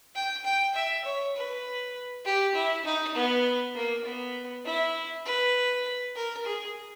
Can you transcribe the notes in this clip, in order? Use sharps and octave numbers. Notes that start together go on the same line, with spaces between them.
G5
G5
E5
C#5
B4
G4
E4
D#4
B3
A#3
B3
E4
B4
A#4
G#4